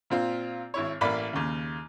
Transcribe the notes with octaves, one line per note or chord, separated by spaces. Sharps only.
A#2 C4 F4
G#1 E4 C#5
A1 A#3 D5 B5
D#2 C#3